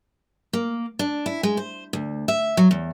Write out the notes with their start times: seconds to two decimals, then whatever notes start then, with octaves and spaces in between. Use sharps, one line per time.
0.53 A#3
0.99 D4
1.26 E4
1.43 G#3
1.57 C5
1.93 D2
2.28 E5
2.57 F#3
2.71 E2